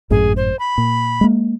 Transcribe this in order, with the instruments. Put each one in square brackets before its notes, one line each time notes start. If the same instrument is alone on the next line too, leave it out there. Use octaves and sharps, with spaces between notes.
[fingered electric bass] G#1 F#2 A2 [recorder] G#4
[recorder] C5
B5
[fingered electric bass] A#2
G#3 A#3